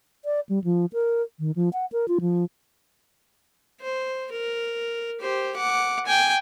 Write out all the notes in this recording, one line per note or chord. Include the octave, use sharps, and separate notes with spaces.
D5
G3
F3
A#4
D#3
F3
F#5
A#4
F4
F3
C5
A#4
G4 C5
F#5 D6
G5 G#5